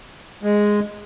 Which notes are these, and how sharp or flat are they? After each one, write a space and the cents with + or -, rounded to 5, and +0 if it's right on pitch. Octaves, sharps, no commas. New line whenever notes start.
G#3 -5